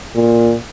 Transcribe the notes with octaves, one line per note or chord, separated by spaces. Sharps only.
A#2